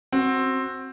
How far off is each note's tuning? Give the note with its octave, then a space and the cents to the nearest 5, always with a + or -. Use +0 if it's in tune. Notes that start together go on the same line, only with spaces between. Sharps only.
C4 +10 F#4 +0